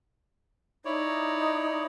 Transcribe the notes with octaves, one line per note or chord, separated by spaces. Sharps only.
D#4 E4 C#5 D5